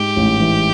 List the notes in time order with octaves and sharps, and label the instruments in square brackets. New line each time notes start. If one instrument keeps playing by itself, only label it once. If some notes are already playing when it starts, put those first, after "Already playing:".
Already playing: [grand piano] G#2 G#3 [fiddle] G4
[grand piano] A1
E3